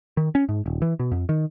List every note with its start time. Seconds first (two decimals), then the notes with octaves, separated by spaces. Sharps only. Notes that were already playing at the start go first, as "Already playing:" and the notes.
0.17 D#3
0.35 C#4
0.49 G#2
0.66 D#1
0.82 E3
0.99 B2
1.12 F2
1.29 D#3